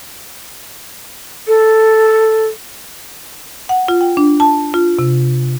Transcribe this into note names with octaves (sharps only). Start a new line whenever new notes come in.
A4
F#5
F4
G5
D4
A5
F4
C3